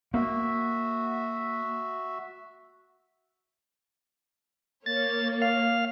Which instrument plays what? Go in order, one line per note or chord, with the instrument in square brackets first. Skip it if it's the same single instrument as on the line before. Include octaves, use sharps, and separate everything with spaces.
[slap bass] A#3 [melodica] F#4 E5
[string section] A#3 C#5 [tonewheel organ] A6
[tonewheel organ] F5